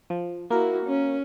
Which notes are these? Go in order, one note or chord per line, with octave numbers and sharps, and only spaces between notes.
F3
A#3 E4 F#4 A#4
C#4